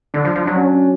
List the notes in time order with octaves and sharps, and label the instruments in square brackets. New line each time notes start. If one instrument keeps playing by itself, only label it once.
[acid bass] D3 [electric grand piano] D4
[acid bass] F3
F3
[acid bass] F#3 [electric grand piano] D4
[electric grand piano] C#4
C#4